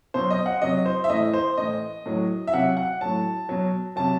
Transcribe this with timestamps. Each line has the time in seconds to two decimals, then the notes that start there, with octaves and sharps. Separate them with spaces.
0.14 B2 F#3 C5
0.30 D#5
0.46 F#5
0.62 C3 F#3 D#5
0.86 C5
1.04 E5
1.10 A2 E3 D#5
1.33 C5
1.57 A2 E3 D#5
2.06 A2 F#3
2.47 E5
2.53 C3 F#3 F#5
2.77 F#5
3.01 A2 F#3 A5
3.49 B2 F#3
3.96 C3 F#3 A5